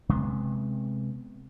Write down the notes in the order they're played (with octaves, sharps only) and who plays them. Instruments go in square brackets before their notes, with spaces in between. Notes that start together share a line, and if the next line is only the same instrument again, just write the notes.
[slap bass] C3 G#3 B3